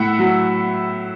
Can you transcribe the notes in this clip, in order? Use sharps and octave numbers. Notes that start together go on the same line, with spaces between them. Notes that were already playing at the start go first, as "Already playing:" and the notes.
Already playing: A2 E5 F#5
F#3